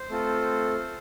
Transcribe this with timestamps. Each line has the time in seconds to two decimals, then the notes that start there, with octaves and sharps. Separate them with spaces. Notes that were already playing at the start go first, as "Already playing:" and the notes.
Already playing: C5
0.09 A3 C4 F4 A4